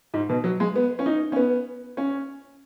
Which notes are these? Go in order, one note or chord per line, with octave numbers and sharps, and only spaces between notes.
G#2
B2
F#3
G#3
B3
C#4
D#4
C#4
B3
C#4